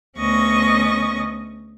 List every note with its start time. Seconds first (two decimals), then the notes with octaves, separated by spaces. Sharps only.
0.18 D2 B3 C#4 D#5 C#6 A#6